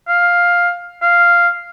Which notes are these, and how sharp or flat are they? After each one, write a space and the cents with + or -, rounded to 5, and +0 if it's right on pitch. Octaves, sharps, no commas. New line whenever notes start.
F5 +10
F5 -5